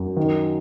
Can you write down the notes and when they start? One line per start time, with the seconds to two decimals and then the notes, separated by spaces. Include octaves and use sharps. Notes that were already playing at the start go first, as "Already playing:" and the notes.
Already playing: F#2
0.17 D#3